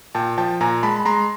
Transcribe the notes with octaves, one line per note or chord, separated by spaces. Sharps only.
A#2 G5 A5
F3 G5 A5
A#2 G#5 A#5
G#3 A5 B5
B5
G#3 A#5 C6